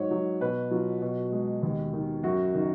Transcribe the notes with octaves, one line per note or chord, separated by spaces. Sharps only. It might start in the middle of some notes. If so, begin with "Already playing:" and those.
Already playing: G#2 F#3 C#5
F#3
B2 B4
F#3 F4
B2
G#3
D#2
D#3
F#2 F#4
D#3